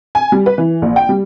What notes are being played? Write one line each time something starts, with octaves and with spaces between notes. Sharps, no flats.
G#5
G3
B4
E3
A#1
G5
G3